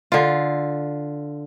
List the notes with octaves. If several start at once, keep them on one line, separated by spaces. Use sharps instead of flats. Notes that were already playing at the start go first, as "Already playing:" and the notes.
D3 F4